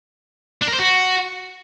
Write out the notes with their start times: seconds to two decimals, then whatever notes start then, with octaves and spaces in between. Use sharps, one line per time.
0.61 D4
0.67 A#4
0.73 C5
0.79 F#4